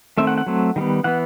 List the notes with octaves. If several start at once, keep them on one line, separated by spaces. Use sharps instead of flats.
D#3 A3 C4 E5
F#5
F#5
F#3 A3 C4
D#3 G3 B3
E3 B3 F#5